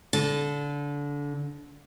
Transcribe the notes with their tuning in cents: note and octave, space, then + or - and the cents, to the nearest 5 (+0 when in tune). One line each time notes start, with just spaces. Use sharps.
D3 -25